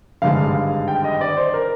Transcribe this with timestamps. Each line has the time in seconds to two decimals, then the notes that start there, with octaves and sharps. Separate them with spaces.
0.22 G#1 G2 D3 G#3 F5
0.88 G5
1.04 D#5
1.21 D5
1.37 C5
1.54 A#4